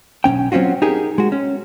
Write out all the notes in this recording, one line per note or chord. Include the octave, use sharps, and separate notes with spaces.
B1 C3 C#4 G5
F#3 C4 C#4 F4 F#4
D#4 G4 G#4 A#4
G#3 F#4
C#4